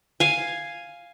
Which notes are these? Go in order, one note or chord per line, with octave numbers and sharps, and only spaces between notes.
F5 G#5